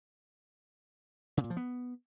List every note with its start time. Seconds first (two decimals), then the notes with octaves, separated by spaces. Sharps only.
1.37 C#3
1.44 A#2
1.50 F3
1.57 B3